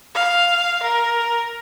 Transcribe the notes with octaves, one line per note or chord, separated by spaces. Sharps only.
F5
A#4